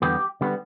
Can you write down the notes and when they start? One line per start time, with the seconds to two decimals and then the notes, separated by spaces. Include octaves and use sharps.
0.02 E2 D3 G3 B3 G4
0.41 D3 G3 B3